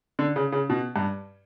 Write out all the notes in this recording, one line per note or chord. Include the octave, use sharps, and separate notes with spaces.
D3
C#3
C#3
B2
G2